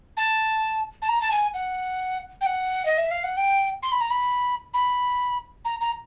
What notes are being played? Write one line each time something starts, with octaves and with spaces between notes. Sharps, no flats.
A5
A5
A#5
A5
G#5
F#5
G5
F#5
D#5
E5
F5
F#5
G5
C6
B5
A#5
B5
B5
A#5
A#5